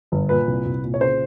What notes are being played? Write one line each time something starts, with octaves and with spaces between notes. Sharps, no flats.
G1
A#2 B4
C2
C2
A#2
C#5
C#3 C5